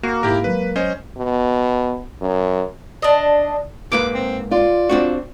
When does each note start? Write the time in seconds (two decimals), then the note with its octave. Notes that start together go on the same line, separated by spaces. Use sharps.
0.03 A#3 F#4
0.23 G#2 E4 G4 A#4
0.44 F#3 G#3 B4
0.76 C#4 C5 D#5
1.17 B2
2.21 F#2
3.02 D4 D#5
3.92 G#2 A#3 B4 D6
4.14 C4
4.51 F4 D5
4.89 C4 D4 F#4